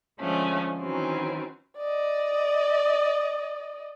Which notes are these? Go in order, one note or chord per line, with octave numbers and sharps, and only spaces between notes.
D3 F3 G#3 A3 C#4
D#3 E3 F#3 C4 C#4
D5 D#5